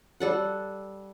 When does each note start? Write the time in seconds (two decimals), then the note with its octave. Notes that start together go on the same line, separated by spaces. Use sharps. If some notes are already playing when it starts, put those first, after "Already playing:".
0.20 G3 A4 F#5